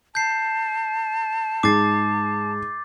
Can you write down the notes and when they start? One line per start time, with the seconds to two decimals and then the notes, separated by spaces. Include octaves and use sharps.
0.15 A5 G6 C7
1.63 G#2 G#3 D6 A6 C7